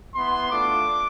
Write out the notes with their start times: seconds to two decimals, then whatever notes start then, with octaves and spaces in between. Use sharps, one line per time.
0.14 B3 E4 C6
0.50 A3 D4 F4 D6